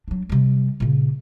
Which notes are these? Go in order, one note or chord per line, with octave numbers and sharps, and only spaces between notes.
F#3 D4
C3 G3
A#2 C#3